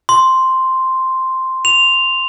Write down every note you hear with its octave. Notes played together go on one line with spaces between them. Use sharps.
C6
F7